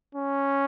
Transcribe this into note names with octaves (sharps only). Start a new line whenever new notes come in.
C#4